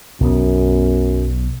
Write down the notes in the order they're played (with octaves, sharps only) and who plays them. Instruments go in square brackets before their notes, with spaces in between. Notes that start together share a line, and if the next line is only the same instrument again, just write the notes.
[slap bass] B1 B3 [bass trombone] F#2